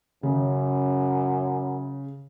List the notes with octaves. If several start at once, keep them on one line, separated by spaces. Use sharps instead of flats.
F#2 C#3